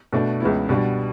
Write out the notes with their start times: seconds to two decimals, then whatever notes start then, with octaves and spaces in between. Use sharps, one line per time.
0.13 B2 A3 D4
0.40 C#2 C#3 E3 B3 E4
0.69 B2 G3 D4 F#4